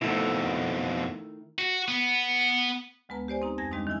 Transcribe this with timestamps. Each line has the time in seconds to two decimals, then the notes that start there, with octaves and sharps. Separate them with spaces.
0.02 F2 B2 D#3 A3 E4
1.59 F#4
1.88 B3
3.09 D2 G#3 B3 B4 A5 A#5
3.28 G4 C5 D5 G#5
3.42 C4 D#4 A#5
3.58 F2 G#5 G#6 A#6
3.71 D#3 G3 G#3 C4 D4 D#4
3.87 D#3 E3 E4 G#5